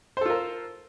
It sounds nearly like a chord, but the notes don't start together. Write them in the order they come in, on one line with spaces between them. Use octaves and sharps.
C5 A4 F4 A#4